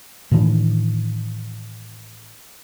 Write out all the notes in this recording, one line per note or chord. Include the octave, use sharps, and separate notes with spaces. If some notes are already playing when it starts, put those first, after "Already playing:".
A2 D#3 E3 D4